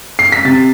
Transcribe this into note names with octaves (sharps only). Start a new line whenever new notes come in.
C7
B6
C3 A6